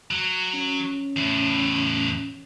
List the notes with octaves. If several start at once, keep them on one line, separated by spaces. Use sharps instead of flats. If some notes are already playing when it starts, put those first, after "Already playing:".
F#3
C#4
E2 A2